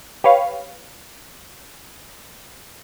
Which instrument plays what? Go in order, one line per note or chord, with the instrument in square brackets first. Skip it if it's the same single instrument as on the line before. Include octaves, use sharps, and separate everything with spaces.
[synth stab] G4 B4 C#5 F5